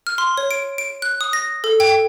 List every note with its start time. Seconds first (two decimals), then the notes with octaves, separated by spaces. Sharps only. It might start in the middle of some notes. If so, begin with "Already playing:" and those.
0.07 F6
0.18 C6
0.38 C#5
0.51 D7
0.78 D7
1.02 F#6
1.21 D#6
1.33 A#6
1.64 A4
1.80 G5